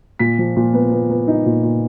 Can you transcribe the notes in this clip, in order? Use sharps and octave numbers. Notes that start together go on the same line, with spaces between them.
A#2 B6
F3
A#2
B3
B3
B3
D#4
A#2
A#2